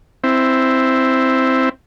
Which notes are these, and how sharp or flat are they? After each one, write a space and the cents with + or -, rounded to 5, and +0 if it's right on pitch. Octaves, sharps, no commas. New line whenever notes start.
C4 +0 E4 +0